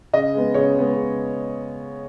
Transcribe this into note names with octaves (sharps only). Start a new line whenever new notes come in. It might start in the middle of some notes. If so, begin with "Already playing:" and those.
C#3 D#5
G#3 B3
C#3 C#5
G#3 B3
C#3